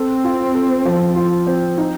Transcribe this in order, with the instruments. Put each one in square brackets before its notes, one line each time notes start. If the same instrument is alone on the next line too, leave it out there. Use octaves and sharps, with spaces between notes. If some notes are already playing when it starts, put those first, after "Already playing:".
Already playing: [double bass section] C4 [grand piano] A4
[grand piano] F4
A4
F3
F4
C4
D#4